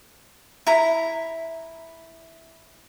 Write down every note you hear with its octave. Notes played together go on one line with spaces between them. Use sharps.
E4 A#5